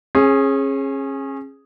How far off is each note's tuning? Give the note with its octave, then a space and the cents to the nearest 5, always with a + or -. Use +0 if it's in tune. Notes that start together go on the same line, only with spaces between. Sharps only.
C#4 -30 G#4 +0